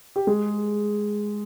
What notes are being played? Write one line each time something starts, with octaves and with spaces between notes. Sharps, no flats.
G4
G#3 G#4